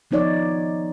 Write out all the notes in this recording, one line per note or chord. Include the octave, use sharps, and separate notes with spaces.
F3 B3 D#4 C#5 D5